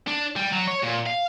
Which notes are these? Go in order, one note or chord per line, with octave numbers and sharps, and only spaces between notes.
D4
G3
F#3
C#5
A#2
F5